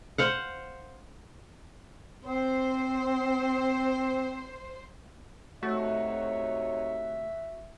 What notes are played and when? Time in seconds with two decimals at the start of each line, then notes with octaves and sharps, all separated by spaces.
0.18 C5 F5 F#5
2.25 C4 C5
5.63 C3 A3 D#4 F#4 C#5 E5